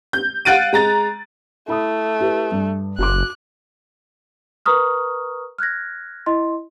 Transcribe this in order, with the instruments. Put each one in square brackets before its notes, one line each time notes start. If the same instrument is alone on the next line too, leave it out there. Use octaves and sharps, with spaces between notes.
[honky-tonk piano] G6
F5 F#5 F#6 A6 D7 D#7
G#3 A#5 A6
[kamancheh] A3 [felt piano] E4 B5 D#6
[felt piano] E4 G4 B4
G2
[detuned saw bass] F#1 [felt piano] F#4 C6 D6 [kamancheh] F#6
[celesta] A#4 B4 A#5 C#6 D#6 F6
F6 F#6 G#6 A#6
E4 D#5 C6